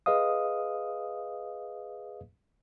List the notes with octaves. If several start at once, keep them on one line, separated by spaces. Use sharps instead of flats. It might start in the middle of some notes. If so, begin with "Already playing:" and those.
G#4 B4 D#5 F5 D#6